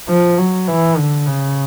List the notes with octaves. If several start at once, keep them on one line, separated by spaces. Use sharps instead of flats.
F3
F#3
E3
D3
C#3